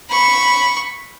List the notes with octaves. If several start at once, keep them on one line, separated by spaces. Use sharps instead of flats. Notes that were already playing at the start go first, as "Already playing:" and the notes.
B5 C#6